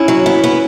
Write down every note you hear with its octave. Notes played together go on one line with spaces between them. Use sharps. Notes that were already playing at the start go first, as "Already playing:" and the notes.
Already playing: C#4 E4
F#3
B3
B3